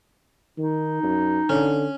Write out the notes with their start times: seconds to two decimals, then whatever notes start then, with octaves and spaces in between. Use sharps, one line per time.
0.58 D#3 D#4
1.03 F#2
1.49 D3 C#4